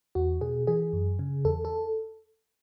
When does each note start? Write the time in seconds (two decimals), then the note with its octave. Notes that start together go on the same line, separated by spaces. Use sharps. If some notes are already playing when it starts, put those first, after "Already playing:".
0.15 E2 F#4
0.41 B2 G#4
0.67 E3 G#4
0.93 F#2
1.19 C#3
1.45 E2 A4
1.65 A4